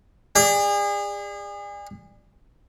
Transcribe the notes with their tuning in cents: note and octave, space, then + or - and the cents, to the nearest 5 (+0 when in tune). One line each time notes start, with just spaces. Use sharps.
G#4 -35 D5 +20